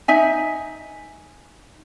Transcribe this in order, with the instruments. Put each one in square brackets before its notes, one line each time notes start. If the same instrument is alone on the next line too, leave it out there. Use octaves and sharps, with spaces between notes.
[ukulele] D#4 E5 G#5